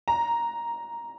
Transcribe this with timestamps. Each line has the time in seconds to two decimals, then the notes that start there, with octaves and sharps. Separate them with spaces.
0.08 A#5